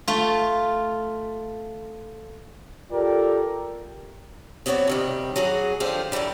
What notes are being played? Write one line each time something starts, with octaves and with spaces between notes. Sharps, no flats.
A3 F4
F4 G4 A4 A#4 D5 G5
F#3 B3 C4 F#4 C#5 D5
C3 D#3 G3
F#3 F#4 G#4
D3 F3 F4 G4 C5
F#2 D3 E3 F3 G3